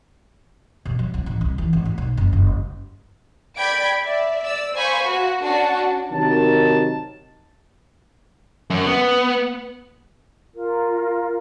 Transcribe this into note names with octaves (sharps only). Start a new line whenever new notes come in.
B2
F#3
C2
A1
C2
E3
G#1
A3
B1
F#1
F#1
D5 G5 B5 G#6 B6 D7
D5 E5
D5 E6
C5 F5 G#5 B5 C#6
F#4
C#4 D4 F#4 A5
C3 D#3 F#3 A#4 A5
F#2
B3
F4 A#4